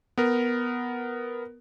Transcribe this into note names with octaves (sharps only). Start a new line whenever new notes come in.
B3 A#4